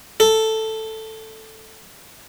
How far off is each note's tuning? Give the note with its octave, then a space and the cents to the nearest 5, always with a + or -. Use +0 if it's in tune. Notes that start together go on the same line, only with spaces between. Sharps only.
A4 +5